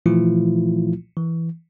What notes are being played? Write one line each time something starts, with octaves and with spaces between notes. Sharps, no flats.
A#2 E3 F3 A3 E4 F4
E3